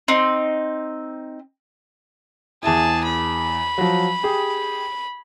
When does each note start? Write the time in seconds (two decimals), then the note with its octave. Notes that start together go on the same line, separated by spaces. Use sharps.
0.08 C4 D#4
2.63 E2 E4 G#4 A5
3.04 B5
3.78 F3 F#3
4.23 G4 G#4